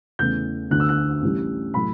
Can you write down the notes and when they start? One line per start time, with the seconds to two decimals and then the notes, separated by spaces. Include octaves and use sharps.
0.19 E2 C#3 E3 A3 G6
0.71 D2 D3 A3 F#6
0.80 E6
0.89 F#6
1.22 A1 A2 G3
1.74 A2 F#3 A3 B5